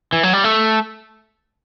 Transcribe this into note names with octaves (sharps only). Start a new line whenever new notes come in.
E3
F#3
G3
A3